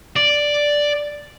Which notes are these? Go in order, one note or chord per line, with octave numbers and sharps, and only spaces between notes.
D5